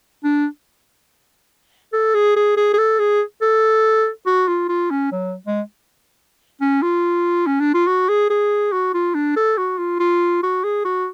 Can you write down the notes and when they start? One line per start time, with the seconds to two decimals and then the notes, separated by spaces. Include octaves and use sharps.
0.24 D4
1.93 A4
2.15 G#4
2.36 G#4
2.57 G#4
2.73 G#4
2.78 A4
2.99 G#4
3.42 A4
4.26 F#4
4.48 F4
4.69 F4
4.91 C#4
5.12 F#3
5.47 G#3
6.61 C#4
6.82 F4
7.47 C#4
7.60 D4
7.74 F4
7.87 F#4
8.09 G#4
8.30 G#4
8.72 F#4
8.94 F4
9.15 D4
9.36 A4
9.58 F#4
9.78 F4
10.00 F4
10.43 F#4
10.64 G#4
10.85 F#4